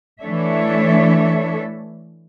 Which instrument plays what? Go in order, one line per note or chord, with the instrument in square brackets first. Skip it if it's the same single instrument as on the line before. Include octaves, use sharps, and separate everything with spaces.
[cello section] E3 A3 D4 A4 C#5 E5